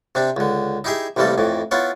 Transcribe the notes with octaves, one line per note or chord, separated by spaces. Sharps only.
C3 C4 D4
C#2 D3
D#4 E4 G4 G#4 E5
A1 C3 E3 G3 A#3 A4
F2 A2 E3
B3 E4 F4 A4 C#5